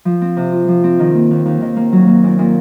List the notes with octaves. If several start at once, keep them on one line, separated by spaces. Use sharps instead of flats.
F3
C4
C3
F4
F3
C4
D#3
A#3
D#2
D#2
D#3
A#3
F#3
A#3
A#2
A#2